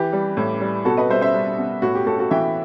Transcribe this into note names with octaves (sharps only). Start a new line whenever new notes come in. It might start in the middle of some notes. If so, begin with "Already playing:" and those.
Already playing: E3 G4 B4
G3
A2
G3
B2 F#4 A4
B4 D#5
G3 C5 E5
C5 E5
G3
B2
A2 F#4
G4
A2 F#4 A4
F#4 A4
E3 E5 G5